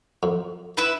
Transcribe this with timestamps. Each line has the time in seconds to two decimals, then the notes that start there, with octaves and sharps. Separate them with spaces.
0.23 F2
0.77 E4 B4 E5 B5